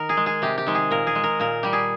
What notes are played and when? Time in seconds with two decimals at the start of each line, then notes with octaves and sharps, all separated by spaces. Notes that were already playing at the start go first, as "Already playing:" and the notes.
Already playing: D#3 A#4
0.09 G#4
0.17 G#3
0.26 G#4
0.42 C3 G4
0.58 G4
0.67 D#3 G#3
0.75 G#4
0.91 A#2 A#4
1.07 G#4
1.15 G#3
1.24 A#4
1.40 A#2 A#4
1.63 G3 G4
1.73 G#4